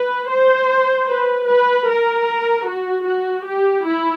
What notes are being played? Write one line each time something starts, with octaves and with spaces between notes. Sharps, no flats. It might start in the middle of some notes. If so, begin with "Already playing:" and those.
Already playing: B4
C5
B4
B4
A#4
F#4
F#4
G4
E4